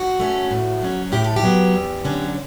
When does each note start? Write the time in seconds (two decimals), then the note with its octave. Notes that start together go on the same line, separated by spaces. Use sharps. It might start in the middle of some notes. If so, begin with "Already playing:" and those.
Already playing: F#4
0.20 A3 C#4
0.51 A2
0.82 F#3 C#4
1.12 A2 G4
1.24 A4
1.36 G4
1.43 F#3 B3
1.74 E2
2.04 D3 F#3 C#4